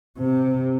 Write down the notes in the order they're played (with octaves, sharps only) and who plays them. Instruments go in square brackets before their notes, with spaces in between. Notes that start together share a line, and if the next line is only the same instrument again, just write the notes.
[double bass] C3